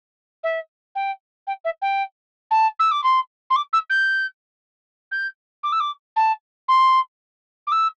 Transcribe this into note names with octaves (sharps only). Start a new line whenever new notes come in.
E5
G5
G5
E5
G5
A5
E6
D6
C6
C6
D6
E6
G6
G6
D6
E6
D6
A5
C6
D6
E6